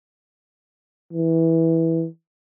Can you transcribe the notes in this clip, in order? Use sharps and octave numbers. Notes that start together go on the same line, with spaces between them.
E3